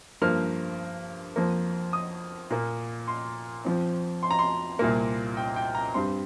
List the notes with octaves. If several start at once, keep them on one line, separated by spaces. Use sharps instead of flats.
G2 F3 A#3 F6
F2 F3 A#3
D#6
A#2 A#3
C6
F2 F3 C4
C6
A#5
C6
C2 A#2 A#3
G5
G5
A#5
G2 G3 C4 C6